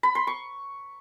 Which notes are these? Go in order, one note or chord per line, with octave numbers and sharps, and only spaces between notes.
B5
C6
C#6